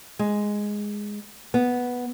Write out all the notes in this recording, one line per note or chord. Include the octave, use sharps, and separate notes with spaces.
G#3
B3